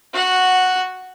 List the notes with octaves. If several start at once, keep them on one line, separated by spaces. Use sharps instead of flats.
F#4 F#5